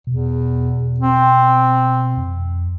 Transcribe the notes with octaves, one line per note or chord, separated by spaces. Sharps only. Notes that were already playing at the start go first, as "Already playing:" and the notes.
E2 B2
C4
F2